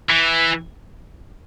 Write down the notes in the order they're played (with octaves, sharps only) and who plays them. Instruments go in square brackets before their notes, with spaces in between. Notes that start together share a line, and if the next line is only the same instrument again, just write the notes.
[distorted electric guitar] E3